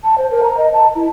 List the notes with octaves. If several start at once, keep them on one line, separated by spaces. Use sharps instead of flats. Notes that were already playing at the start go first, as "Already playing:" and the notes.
A5
C5
A#4
A#5
D#5
A5
E4